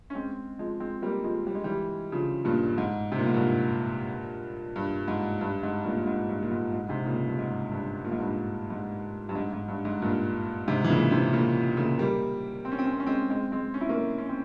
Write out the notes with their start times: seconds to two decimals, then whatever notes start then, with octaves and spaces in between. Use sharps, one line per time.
0.10 C#4
0.15 G#3 C4
0.59 F3 G#3
0.80 G#3 C4
1.02 G3 A#3
1.24 F3 G#3
1.47 G3
1.55 G#3
1.64 E3 G3
2.12 C#3 F3
2.45 G2 A#2
2.78 G#2
3.12 C3
3.19 A#2
3.26 G#2
3.34 G2 A#2
4.76 G2
5.08 G#2
5.41 G2
5.63 G#2
5.85 G2 A#2
5.97 A#2
6.07 G#2
6.29 G2
6.42 A#2
6.52 G#2
6.73 G#2
6.89 G#2 C3
7.06 A#2 C#3
7.27 G2
7.39 G#2
7.71 G2
8.04 A#2
8.12 G#2
8.20 G2
8.28 G#2
8.70 G#2
9.29 G2
9.35 G#2
9.53 G#2
9.68 G2
9.85 G#2
10.02 G2 A#2
10.68 G#2 C3
10.84 E3
10.90 A#2 C#3
11.11 C3 E3
11.33 A#2 C#3
11.77 A#2 C#3
11.99 G3 A#3
12.65 C4
12.72 C#4
12.79 C4
12.85 C#4
12.92 C4
13.00 C#4
13.07 G#3 C4
13.30 G#3 C4
13.52 G#3 C4
13.74 C#4
13.81 E4
13.89 A#3 C#4
14.18 C#4
14.29 C4